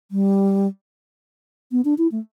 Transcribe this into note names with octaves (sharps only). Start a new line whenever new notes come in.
G3
B3
D4
E4
A3